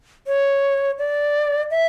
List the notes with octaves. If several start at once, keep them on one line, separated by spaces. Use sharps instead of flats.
C#5
D5
E5